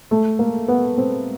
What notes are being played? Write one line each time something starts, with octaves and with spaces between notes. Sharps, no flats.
A3
A#3
B3
C4